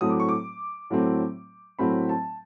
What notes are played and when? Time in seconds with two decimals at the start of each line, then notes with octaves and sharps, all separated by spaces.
0.01 A2 F#3 A3 C4 D#6
0.10 D6
0.20 C#6
0.29 D6
0.90 A2 F#3 A3 C4
1.79 A2 F#3 A3 C4 B5
2.09 A5